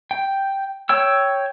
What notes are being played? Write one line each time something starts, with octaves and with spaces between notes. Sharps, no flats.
G5
C#5 G5 E6